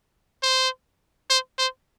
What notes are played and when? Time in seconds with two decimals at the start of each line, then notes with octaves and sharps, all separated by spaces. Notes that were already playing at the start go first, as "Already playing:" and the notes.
0.43 C5
1.30 C5
1.58 C5